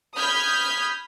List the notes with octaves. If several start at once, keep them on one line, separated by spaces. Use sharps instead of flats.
B5 D#6 F6 G6 G#6 B6